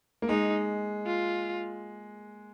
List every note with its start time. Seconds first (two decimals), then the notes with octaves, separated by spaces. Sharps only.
0.22 A#3
0.29 G#3 D#4
1.07 F4